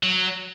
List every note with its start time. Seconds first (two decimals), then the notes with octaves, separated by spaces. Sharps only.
0.03 F#3